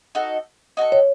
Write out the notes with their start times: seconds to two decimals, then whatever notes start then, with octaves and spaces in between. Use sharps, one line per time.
0.15 D#4 F#4 A4
0.77 D#4 F#4 A4
0.92 C#5